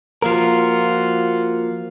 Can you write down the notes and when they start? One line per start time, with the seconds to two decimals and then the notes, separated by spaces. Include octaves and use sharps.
0.22 F3 A#3 F4 F#4 A#4